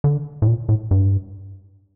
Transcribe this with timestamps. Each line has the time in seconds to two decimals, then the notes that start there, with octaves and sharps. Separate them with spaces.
0.04 D3
0.42 A2
0.47 A#2
0.69 A2
0.91 G2